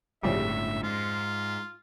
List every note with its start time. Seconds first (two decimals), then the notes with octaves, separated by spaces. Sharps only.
0.23 G1 F2 A2 C#3 G3 E5
0.83 G#2 F4